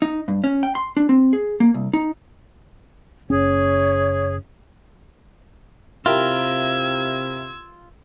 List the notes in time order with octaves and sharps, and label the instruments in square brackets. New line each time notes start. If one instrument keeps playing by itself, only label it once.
[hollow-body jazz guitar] D#4
G2
C#4
G5
C6
D4
C4
G#4
A#3
C2
D#4
[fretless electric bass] F#1 C#4 [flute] G#4 [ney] C#5
[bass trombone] C3 [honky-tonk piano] E4 G4 A#4 [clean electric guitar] F4 [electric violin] E6 G#6